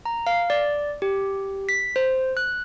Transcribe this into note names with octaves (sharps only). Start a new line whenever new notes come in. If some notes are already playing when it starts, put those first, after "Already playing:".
A#5
F5
D5
G4
B6
C5
F#6